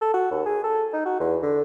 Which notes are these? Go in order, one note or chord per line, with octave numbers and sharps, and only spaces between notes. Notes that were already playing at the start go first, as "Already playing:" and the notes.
A4
F#4
D#2
G#4
A4
D#4
F#4
E2
D3